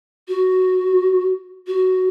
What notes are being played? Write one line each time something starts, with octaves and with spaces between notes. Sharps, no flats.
F#4
F#4